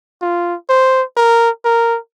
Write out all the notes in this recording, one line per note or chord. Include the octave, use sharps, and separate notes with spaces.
F4
C5
A#4
A#4